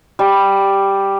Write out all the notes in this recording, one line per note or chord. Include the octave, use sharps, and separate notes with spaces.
G3